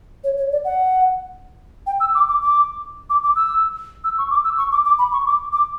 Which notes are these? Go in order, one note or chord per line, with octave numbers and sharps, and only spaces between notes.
C#5
C#5
D5
F#5
G5
E6
D6
D6
D6
D6
D6
E6
E6
C#6
D6
E6
C#6
D6
D6
B5
C#6
D6
D6